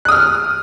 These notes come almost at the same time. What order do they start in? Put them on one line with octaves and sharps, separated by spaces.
F#6 D#6 F6